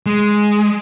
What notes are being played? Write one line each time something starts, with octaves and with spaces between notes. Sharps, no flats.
G#3